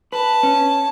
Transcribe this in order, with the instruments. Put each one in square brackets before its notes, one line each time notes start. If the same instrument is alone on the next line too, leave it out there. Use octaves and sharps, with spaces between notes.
[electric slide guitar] B4 [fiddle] A5
[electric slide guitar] C#4